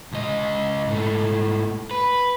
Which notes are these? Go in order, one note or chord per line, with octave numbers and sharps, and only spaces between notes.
C#2 D#5
G#2 A3
B4